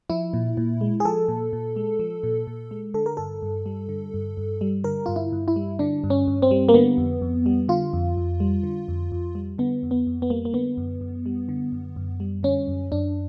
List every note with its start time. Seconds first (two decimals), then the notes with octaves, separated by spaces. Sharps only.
0.10 F3 E4
0.33 A#2
0.57 A#2
0.81 G#3
1.00 G#4
1.05 F3 A4
1.28 A#2
1.53 A#2
1.76 G#3
1.99 F3
2.23 A#2
2.47 A#2
2.71 G#3
2.94 D3 A4
3.06 A#4
3.17 G2 A4
3.42 G2
3.66 G3
3.89 D3
4.14 G2
4.37 G2
4.61 G3
4.84 D3 A#4
5.06 G2 F4
5.16 E4
5.32 G2
5.48 E4
5.56 G3
5.79 D3 D4
6.04 G2
6.10 C#4
6.27 G2
6.42 C4
6.51 G3
6.69 A#3
6.74 D3 B3
6.98 F2
7.21 F2
7.46 G3
7.69 D3 F4
7.93 F2
8.17 F2
8.40 G3
8.63 D3
8.88 F2
9.12 F2
9.35 G3
9.58 D3 B3
9.83 F2
9.91 B3
10.07 F2
10.22 B3
10.30 G3 A#3
10.45 A#3
10.53 D3 B3
10.77 F#2
11.01 F#2
11.26 G3
11.49 D3
11.72 F#2
11.96 F#2
12.20 G3
12.43 D3 C#4
12.67 F#2
12.92 F#2 D4